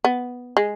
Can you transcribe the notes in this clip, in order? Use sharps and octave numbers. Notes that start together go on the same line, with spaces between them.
B3
G#3